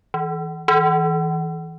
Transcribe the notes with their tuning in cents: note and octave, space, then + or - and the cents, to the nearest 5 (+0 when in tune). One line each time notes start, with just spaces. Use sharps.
E3 -20
E3 -20